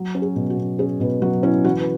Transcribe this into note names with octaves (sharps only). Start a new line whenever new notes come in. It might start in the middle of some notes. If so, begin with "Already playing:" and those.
Already playing: F#3
C#4
G#4
B2
F#4
B2
C#4 G#4
B2 B4
F#3 F#4
C#4 E4
E3 F#4
B4